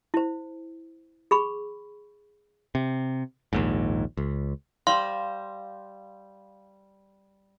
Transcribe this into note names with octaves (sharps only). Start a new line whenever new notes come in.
E4 C5
G#4 B5 C#6
C3
A#1 D#2 G#2
C#2
G3 C5 F5 C6